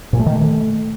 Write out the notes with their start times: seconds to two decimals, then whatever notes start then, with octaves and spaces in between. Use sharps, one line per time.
0.13 A#2
0.20 A3
0.26 D#3
0.33 A3